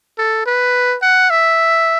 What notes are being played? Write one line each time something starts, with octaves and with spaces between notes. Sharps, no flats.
A4
B4
F#5
E5